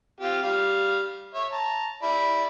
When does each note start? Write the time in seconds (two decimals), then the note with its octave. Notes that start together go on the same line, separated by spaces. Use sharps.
0.21 C4 F4 G4
0.43 G3 F5
1.35 C#5 E5
1.52 A5 A#5
2.03 E4 D5 B5